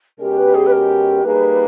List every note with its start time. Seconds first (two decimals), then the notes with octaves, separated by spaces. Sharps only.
0.19 B2 G#3 C#4 G4 A#4
0.37 B4
0.54 G#4
0.66 B4
0.72 A#4
1.24 G3 A#3 D#4 G#4 B4